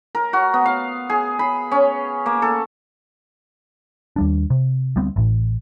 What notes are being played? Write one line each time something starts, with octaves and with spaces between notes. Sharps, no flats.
A#4
F#4
B3
F5
G#4
B5
C#4
A#3
A4
D#2 G3 D4
C3
D2 G3 B3 C4
A1 A2